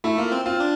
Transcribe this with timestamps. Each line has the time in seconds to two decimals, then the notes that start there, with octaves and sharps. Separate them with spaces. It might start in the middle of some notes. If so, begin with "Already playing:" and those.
0.04 A3 E4
0.18 A#3 F4
0.32 C4
0.45 C4 F4
0.60 D4